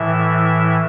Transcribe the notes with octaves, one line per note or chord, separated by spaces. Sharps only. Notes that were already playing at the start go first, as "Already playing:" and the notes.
Already playing: A2 E3 E5
E5